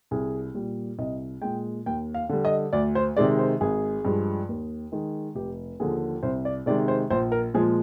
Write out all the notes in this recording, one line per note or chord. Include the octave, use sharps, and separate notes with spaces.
C2 G#4
A#2 G3
C2 D#5
A#2 G#3 G5
D#2 G5
F5
D3 G3
D#5
D2 D5
C5
C3 D#3 G#3 D5
C5
G#1 G#4
G2 F3 G#3
D#2
D#3 G#3
F1 G4
D#2 D3 F3 G#4
C2 C5
D5
C3 D#3 G#3 D5
C5
A#1 C5
A#4
A#2 F3 G#3 G#4